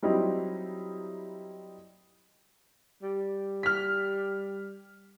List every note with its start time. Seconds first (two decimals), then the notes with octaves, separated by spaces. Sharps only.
0.02 F#3 G3 C4 D#4 E4 G4
3.03 G3
3.63 F6 B6